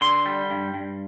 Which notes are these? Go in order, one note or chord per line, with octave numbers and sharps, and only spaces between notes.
D3 C6
G3
G2
G2